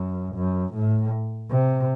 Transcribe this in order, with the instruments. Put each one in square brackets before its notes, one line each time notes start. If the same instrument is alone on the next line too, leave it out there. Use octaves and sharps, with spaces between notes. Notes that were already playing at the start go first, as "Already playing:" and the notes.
Already playing: [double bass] F#2
F#2
A2
C3